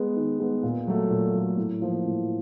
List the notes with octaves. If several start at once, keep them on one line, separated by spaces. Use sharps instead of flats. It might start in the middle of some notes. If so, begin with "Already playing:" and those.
Already playing: G#3 B3
D#3
G#3 B3
A#2
F#3 A3
A#2
F#3 A3
A2
F3 A#3
A2